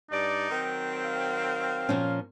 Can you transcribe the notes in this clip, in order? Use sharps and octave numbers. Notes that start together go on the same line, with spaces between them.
G2 D#4 D5
D#3 F#3 C4
F5
A#2 F3 C#4